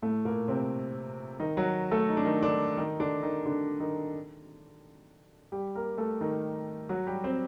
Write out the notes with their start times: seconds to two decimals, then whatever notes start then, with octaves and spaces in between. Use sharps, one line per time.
0.02 A2 A3
0.25 A#2 A#3
0.48 C3 C4
1.40 D#3 D#4
1.57 F#3 F#4
1.91 A3 A4
2.09 D#4
2.17 D4
2.25 D#3 D#4
2.42 D3 D4
2.77 D#3 D#4
3.00 D3 D4
3.23 D#3 D#4
3.46 D3 D4
3.80 D#3 D#4
5.52 G3 G4
5.75 A#3 A#4
5.98 A3 A4
6.21 D#3 D#4
6.89 F#3 F#4
7.07 G3 G4
7.24 C4 C5